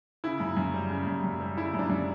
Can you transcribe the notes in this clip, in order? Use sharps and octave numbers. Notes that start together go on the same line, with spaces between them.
C#3 E4
F#2
F#2
G3
C#3
F#2
F#2
G3
C#3 E4
F#2 D4
F#2